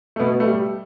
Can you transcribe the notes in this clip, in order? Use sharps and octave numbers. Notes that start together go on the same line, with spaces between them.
A3
B2 B3
A3
G3